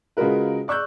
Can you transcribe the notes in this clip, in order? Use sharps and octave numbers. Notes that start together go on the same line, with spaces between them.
C#3 G#3 F4 F#4 A#4 B4
D5 C#6 E6 F#6 G6